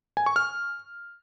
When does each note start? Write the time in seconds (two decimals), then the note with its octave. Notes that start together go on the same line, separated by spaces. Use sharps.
0.17 G#5
0.26 C#6
0.36 F6